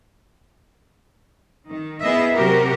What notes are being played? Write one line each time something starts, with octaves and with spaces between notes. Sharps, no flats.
D#3
B3 E4 G#4 D#5 E5
C3 F#3 F#4 G4 A#4